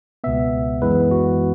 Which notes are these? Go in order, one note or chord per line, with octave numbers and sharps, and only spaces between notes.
C#2 B2 B3 E5
F#2 E3 G#3 B3 B4
F#4